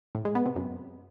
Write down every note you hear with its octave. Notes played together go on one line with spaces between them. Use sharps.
A2
G#3
B3
C3
F#2